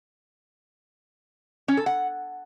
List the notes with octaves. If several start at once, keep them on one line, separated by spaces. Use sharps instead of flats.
C#4
A4
F#5